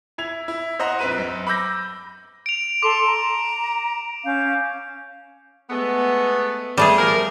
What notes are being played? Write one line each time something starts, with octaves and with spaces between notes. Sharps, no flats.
E4 G#6 F7
E4
C5 D#5 F#5 A#5
A#1 C4 B4 D#7
F#2
B5 D6 E6 G6 A#6
D7 F7
A4 C6 D6
A#5
C#4 F5 G6
G#3 A3 B3
G3 A3 G#4
F3 A#4